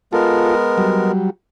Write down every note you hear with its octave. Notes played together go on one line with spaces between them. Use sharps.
G#3 B3 F4 A4 A#4
F#3 G3